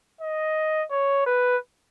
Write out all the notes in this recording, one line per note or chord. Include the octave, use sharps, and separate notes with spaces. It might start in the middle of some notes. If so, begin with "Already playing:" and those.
D#5
C#5
B4